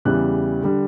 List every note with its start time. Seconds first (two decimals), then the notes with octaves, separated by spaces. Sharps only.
0.05 E2 C#3 E3 G3 F#6
0.63 D3 G3